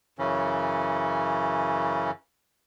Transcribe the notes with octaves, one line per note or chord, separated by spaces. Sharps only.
F#2 C#3 E3 C#4